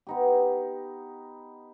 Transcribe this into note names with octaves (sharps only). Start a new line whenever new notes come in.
B3 D#4 G4